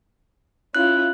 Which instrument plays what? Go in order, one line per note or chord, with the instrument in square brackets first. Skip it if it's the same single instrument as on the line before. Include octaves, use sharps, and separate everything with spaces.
[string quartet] C#4 E4 F4 [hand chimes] F#6